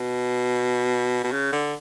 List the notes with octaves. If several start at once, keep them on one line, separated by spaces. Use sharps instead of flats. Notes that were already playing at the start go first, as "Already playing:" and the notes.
Already playing: B2
B2
C#3
D3